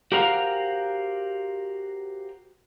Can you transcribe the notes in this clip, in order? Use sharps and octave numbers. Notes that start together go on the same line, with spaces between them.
F#4 G4 A#4 C5 F5 F#5